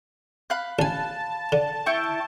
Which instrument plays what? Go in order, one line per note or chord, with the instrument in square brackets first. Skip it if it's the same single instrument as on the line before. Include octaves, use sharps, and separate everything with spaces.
[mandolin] F5 B5 F#6
[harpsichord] A1 G#5 [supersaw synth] A5
[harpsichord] D3
[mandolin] E4 G5 C#6